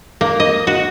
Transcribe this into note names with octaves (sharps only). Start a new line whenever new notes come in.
A#3
D#5
F#4